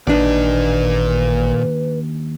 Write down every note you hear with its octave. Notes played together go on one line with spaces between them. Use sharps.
A1 D#2 A#2 D4 D#4 B4 D5